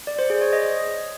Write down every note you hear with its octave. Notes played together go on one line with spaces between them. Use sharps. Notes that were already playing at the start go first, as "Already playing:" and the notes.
D5
C5
G#4
C#5
D#5